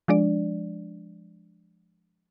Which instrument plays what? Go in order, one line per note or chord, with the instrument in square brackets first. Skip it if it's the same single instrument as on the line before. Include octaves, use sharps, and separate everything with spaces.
[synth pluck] F3 G#3 D4 D5